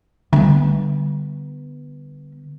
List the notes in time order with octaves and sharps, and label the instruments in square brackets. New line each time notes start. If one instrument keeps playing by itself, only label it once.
[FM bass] D3 [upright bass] G3 B3